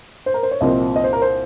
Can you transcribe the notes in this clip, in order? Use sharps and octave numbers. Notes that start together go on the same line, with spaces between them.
C5
A#4
C5
C#5
C2 A#2 F3 C4 D#5
D#5
C5
A#4
C5